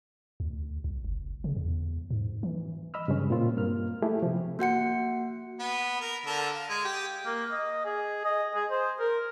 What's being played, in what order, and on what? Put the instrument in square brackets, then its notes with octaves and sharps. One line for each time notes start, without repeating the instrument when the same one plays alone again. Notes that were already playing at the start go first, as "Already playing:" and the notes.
[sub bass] D2
C2
F#1
C#3
E2
G#2
E3
[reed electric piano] D#5 B5 E6 F6
G2 C#3 G#3 C#4
A#2 C4 F4
G2 A#3 F6
A3 E4 G4 G#4
C3 F3
[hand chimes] A#3 F#4 F#5 C#7
[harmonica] B3
A#4
D3 A4 A#4
F5
G#3 G#4
G4
[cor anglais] A#3
D#5
G#4
D#5
G#4
C5
A#4